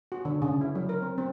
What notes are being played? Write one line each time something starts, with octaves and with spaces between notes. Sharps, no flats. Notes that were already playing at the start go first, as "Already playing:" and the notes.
F#4
D3
C#3
E4
F#3
A#4
C4
C4